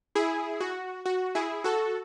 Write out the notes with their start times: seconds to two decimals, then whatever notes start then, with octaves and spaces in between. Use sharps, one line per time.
0.15 E4 G#4
0.60 F#4
1.06 F#4
1.35 E4 G#4
1.64 F#4 A4